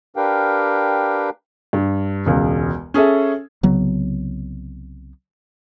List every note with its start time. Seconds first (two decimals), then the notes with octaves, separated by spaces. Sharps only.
0.16 D4 G4 A#4 B4 F5 G5
1.73 G2
2.26 E1 C#2
2.94 C#4 G#4 A4 E5
3.63 C2 C#3 F#3 B3